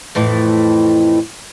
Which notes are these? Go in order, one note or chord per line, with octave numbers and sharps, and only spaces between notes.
F2 A2 E3